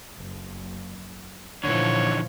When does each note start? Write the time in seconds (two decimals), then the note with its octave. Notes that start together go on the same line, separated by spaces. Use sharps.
0.17 F#1
1.64 A#2 D3 E3 F3 C#5